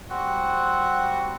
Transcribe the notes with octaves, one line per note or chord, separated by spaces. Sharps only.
G3 C4 F#4 F#5